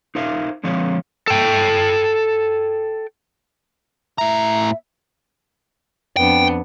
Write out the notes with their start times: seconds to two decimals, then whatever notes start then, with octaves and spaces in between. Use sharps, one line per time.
0.15 D#4 A#4 C5 E5 F5
0.64 D3 F3 G#3 C4 C#5 F5
1.27 A4 G5
4.18 A2 E5 A#5
6.17 F2 B3 D4 G5